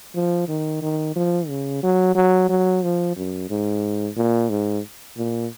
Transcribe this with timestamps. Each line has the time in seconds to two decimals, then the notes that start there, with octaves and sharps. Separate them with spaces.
0.15 F3
0.48 D#3
0.82 D#3
1.16 F3
1.48 C#3
1.83 F#3
2.15 F#3
2.49 F#3
2.83 F3
3.16 F#2
3.50 G#2
4.16 A#2
4.50 G#2
5.17 A#2